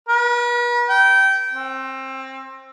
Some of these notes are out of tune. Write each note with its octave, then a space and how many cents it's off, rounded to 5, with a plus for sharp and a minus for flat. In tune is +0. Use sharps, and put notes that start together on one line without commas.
B4 -40
G5 -20
C4 +25